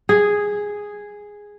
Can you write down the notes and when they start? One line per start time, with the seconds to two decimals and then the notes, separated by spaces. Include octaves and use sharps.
0.09 G#4